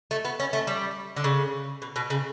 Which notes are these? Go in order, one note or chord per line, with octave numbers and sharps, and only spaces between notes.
A3
B3
C#4
A3
G3
D3
C#3
B2
B2
C#3